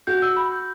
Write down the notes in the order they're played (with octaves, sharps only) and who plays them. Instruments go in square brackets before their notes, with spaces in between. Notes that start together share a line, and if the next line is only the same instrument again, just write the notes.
[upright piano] F#4 [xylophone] G6
[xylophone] E6
B5
G6